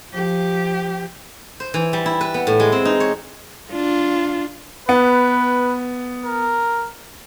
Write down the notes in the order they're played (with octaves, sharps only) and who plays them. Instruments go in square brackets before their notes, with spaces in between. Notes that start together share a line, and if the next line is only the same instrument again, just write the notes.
[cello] F3 G4
[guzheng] C5
E3
G3
E4
B4
B3
A2
G#3
C4
D#4
C#5
[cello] D4 F4
[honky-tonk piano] B3 [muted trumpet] B4
[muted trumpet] A#4